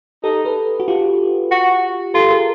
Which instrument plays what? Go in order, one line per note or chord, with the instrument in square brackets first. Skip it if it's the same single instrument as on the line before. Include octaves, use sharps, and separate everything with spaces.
[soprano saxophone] D#4 [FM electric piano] G4 A4
[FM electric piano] A4 B4
F#4
F4 G4
[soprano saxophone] F#4
[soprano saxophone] F4 [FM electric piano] G4 A4
[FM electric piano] G#4 A#4